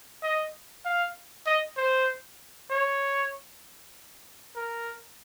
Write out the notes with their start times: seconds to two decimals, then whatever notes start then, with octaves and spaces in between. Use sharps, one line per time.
0.23 D#5
0.85 F5
1.46 D#5
1.77 C5
2.70 C#5
4.56 A#4